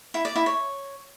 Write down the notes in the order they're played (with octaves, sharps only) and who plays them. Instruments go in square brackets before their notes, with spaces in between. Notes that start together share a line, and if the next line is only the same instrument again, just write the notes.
[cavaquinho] E4
D5
E4
C#5